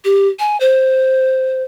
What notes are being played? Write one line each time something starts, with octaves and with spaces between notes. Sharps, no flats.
G4
G#5
C5